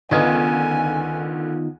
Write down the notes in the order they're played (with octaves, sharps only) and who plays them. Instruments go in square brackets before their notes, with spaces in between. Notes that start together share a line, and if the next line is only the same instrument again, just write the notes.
[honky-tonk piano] C#2 D3 G#6 [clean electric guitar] D#3 [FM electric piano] B3 D#4 F4 [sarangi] G#5